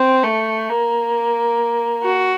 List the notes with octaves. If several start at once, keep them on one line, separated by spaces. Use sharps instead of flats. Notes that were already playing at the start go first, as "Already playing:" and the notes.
Already playing: C4
A3
A#3
F#4